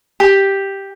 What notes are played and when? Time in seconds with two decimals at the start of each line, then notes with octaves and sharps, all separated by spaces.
0.20 G4